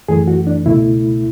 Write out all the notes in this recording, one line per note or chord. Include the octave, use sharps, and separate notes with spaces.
F#2 E3 A3 G#4
F#4
D4
C#2 B2 A3 E4